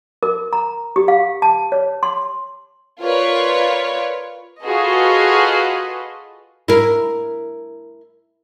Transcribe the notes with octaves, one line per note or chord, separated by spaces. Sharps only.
A#4
A#5
G4
F5
A5
C#5
C6
F4 A#4 B4 C#5 D5
F4 F#4 G#4 A4 B4 D#5
E4 A#4